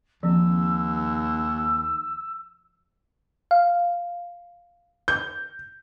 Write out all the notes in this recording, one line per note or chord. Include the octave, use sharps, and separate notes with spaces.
D#2 F3 C4 E6
F5
G6